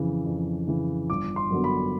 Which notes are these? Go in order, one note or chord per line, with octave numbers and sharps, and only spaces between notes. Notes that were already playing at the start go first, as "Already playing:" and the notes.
Already playing: F2 C#3 E3
F2
C#3 E3
G1 D6
C6
F#2 D3 F#3 B3
B5